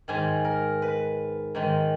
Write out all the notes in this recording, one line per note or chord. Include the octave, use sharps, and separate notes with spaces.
G#2 D#3 G#4
A#4
B4
G#2 D#3